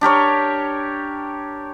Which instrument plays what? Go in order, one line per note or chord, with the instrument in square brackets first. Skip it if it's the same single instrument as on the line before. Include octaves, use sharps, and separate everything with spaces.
[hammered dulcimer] D4 G4 A#4 C#5